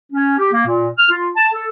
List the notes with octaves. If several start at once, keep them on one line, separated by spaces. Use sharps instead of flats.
C#4
G4
A#3
A#2
F6
F4
A5
A4